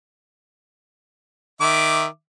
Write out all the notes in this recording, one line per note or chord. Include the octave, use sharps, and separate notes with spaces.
D#3 E5 D6